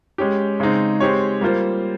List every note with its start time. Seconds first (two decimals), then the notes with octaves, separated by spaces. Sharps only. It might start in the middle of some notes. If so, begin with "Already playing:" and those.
0.18 G#3 C#4 G4
0.60 C#3 G#3 C4 D#4
1.00 G#3 C4 G4 C#5
1.41 G3 A#3 F4 C5